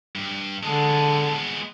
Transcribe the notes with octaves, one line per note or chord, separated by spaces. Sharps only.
G2
D3 G#3 B3 A5